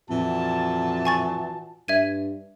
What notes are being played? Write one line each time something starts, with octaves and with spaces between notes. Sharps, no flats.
F2 A#2 E3 F#4 A5
G#5 C#6 A6
G2 E5 G#6 D#7